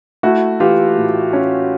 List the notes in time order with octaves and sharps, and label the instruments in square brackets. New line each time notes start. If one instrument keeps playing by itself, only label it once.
[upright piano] A3 E4 F#4
E3 F4 G4
A2
C#4